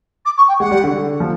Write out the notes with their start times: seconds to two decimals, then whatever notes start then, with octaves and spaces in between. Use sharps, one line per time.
0.25 D6
0.37 C#6
0.48 G5
0.60 G#3 F#5
0.71 G3
0.84 D3
1.20 F3